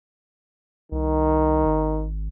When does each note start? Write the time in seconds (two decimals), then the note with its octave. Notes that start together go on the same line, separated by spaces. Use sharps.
0.92 C2 D#3
1.66 G#1